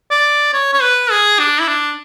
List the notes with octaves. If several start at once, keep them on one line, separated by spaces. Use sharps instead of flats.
D5
C#5
C#5
B4
G#4
D4
E4
D4